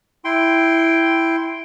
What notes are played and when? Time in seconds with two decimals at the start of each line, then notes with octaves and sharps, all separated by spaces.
0.25 E4 G5 C6